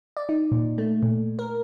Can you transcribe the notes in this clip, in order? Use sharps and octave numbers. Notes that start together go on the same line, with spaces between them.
D5
D#4
A#2
A3
A#2
A#4